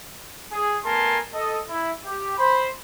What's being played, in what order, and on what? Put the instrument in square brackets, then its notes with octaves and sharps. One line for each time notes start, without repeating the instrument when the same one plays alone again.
[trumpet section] G#4
A3 B3 A#4 G#5 A5 C6
A4 D#5
E4
G4
C5 B5